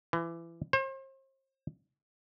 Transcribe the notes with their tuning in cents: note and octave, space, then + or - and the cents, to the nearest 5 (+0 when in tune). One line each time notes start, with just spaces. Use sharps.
E3 +25
C5 +40